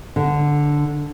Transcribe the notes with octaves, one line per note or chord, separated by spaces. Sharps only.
D3